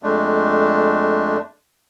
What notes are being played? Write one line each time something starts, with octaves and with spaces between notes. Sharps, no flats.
F2 G#3 A3 D4